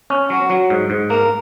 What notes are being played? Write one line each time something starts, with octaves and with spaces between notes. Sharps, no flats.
C#4
F#3 F#4
F#3
G#2
G#2
A#3 A#4